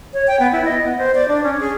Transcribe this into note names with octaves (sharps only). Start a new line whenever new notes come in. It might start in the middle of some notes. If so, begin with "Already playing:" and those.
C#5
G5
B3
E4
D#5
B3
C5
D5
D4
C#4
G#4